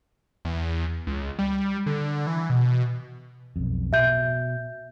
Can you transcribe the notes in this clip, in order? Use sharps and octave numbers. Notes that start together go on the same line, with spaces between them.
E2
C#2
G3
D3
E3
B2
B1 F2
B2 E5 G6